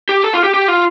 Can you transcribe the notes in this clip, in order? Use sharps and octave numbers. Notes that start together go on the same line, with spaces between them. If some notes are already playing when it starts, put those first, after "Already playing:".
G4
A4
F4
G4
G4
F4